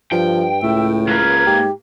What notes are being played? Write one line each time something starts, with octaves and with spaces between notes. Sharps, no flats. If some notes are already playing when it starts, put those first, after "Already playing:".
G2 F3 G5
C#2 A2 E5
A#3 B4 G#6
G#2 G4